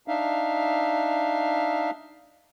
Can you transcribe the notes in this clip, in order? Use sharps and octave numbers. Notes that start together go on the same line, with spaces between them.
D4 D#4 E5 F5